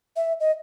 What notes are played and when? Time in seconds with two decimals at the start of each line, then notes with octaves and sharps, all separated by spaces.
0.16 E5
0.40 D#5